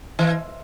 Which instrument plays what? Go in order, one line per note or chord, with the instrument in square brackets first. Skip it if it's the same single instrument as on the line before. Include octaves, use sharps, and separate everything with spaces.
[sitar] E3